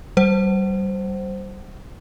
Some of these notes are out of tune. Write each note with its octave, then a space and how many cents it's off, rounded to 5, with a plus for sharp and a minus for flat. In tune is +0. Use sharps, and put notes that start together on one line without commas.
G3 -30 C5 +0 F#5 +30